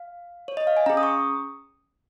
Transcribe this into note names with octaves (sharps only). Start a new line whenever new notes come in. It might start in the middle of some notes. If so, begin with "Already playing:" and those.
Already playing: F5
C#5
D#5
F5
G#5
C#4 G#4 A#5
D#6
C#6